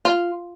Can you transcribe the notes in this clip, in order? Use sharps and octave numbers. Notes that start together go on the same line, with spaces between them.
F4